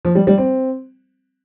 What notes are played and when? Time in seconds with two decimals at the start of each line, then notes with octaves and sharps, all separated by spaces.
0.05 F3
0.15 G3
0.27 G3
0.38 C4